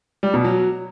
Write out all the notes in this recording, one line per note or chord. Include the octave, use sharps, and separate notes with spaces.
G3
B2
F#3